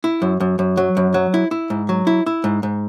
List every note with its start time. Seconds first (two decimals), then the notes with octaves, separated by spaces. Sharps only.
0.04 E4
0.22 F#2
0.40 F#2
0.59 F#2
0.77 F#3
0.97 F#2
1.14 F#3
1.34 E4
1.51 E4
1.70 G#2
1.89 F#3
2.07 E4
2.26 E4
2.44 G#2
2.63 G#2